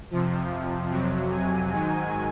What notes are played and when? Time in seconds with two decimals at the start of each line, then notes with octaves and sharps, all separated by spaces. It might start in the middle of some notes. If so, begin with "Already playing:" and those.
0.11 F2 C3 F3
0.91 F2 C3 F#3
1.31 G#5
1.71 G#2 D#3 F#3